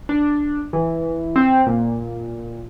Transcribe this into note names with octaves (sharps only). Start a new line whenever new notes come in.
D4
E3
C4
A#2